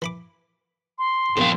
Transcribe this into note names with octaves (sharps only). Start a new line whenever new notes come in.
E3 B5 D6
C6
A#1 E2 C3 G4 F5